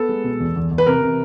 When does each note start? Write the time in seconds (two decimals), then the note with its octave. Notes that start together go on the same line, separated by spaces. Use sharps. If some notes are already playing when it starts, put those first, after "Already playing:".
Already playing: B3 A4
0.09 G#3
0.24 B2
0.40 E2
0.56 E2
0.71 E2
0.78 B4
0.86 C3 A#4
1.02 C3